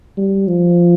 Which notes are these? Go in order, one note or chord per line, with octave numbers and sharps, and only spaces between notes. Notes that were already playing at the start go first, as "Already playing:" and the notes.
G3
F3